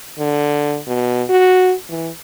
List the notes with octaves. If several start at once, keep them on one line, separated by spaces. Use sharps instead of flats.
D3
B2
F#4
E3